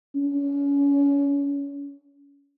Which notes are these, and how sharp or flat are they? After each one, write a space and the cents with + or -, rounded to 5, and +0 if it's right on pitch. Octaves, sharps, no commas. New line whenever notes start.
C#4 +30